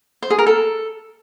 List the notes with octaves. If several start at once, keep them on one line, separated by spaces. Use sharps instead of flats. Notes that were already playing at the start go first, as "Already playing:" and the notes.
C5
G#4
A#4
A4